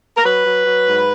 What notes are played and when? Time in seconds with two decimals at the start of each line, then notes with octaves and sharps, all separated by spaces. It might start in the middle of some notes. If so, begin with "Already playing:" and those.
0.17 A#4
0.25 F#3 B4
0.45 F#3
0.65 F#3
0.85 G#2